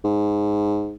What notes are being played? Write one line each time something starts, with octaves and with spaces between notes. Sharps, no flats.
G#2